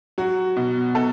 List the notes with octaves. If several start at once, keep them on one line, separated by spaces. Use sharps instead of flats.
F#3 F#4
B2
B2 A4